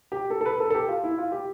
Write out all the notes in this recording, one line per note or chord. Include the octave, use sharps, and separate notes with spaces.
G4
A4
A4
B4
A4
A4
G4
F4
E4
F4
G4